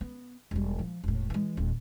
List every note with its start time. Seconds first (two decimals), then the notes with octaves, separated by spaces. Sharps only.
0.01 B3
0.51 E1 G3
0.79 F3
1.04 E1 A2
1.30 E3 G#3
1.57 D#1 F2